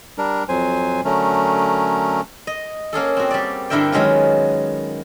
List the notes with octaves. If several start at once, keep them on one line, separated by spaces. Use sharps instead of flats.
G3 D4 A#4
F2 F#3 C5 G#5
D3 F#3 A3 C#4 A#4
D#5
A#3 C#4 G#4 A4
C4 F#4
G3 D5
G2 D3 E4 A#4 E5 G5
D#3 F#3 G#3 B3 C#4 F4